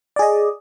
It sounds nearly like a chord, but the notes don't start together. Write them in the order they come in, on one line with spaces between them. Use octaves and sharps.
D5 G#4 D#5